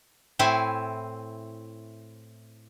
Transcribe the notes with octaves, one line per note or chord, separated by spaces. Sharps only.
A2 C4 E4 G#5